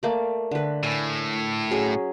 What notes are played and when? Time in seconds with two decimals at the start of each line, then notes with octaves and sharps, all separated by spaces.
0.03 A3 A#3 D5
0.51 D3 B4
0.83 A2 G#5
1.71 F#3 C#4 G#4